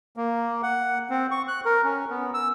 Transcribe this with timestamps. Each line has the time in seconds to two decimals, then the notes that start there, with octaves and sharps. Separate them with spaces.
0.17 A#3
0.63 F#5
1.10 C4
1.31 C#6
1.48 F#6
1.65 A#4
1.84 C#4
2.10 B3
2.34 E6